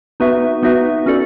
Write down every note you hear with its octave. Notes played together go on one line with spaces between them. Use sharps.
B3 D#4 F#4 B4 E5
B3 D#4 F#4 B4 E5
C#4 F#4 A4 D5